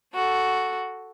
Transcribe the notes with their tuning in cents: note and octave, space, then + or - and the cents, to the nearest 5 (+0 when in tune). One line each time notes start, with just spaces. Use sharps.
F#4 +0 A4 +0